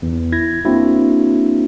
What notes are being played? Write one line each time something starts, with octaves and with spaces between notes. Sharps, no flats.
E2
E4 G#6 A#6
A#3 C4 D4 E4 F#4